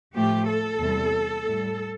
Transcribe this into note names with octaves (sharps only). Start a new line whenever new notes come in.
A2 F3 A3 G4
A4
E2 C3 G3
A2 G3